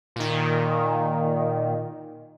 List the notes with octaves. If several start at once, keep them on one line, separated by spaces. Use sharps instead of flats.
A#2 D#3